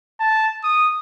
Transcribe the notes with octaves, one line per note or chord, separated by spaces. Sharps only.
A5
D#6